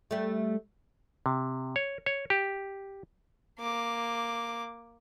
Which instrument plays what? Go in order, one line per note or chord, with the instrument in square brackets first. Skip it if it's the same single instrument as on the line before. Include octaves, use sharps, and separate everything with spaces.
[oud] G3 A3
[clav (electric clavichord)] C3
C#5
C#5
G4
[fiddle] A#3 D6